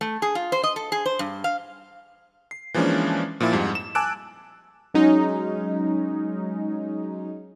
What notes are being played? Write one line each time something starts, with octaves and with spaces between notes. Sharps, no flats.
A3
G#4
F4
C5
D#5
A4
G#4
C5
G2
F5
C7
E3 F3 G#3 A#3 C#4 D4
A#2 F3 A#3 E4
F2 G#2 G3
E7
G#5 A5 D6 E6 F#6 D7
F#3 G#3 C#4 D#4